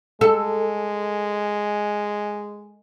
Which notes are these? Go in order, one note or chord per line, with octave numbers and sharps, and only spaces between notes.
G#3 A4